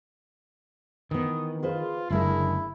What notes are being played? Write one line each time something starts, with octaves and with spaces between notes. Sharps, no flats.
D#3 E3 B3 D#6
F4 G#4 B4 C5
F#1 D3 G#3 E4 A#4